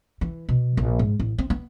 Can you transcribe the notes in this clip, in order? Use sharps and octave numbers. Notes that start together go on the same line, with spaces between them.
E3
B2
A#1
G#2
A1
C4
B3